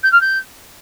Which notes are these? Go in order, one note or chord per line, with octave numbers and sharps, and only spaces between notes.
G6
F6
G6